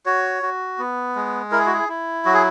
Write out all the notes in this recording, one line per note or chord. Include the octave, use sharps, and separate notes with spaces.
F#4 C#5
F#4
B3
G#3
E4 A#4
G#4
F#4
G#4
E4
F#3 F#4
G#4